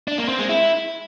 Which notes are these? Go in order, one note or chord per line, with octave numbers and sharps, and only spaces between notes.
D4
A#3
C4
G#3
E4